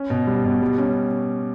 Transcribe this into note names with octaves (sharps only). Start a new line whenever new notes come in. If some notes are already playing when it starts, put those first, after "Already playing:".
Already playing: C#4
B2
G3
B2
G3
C#4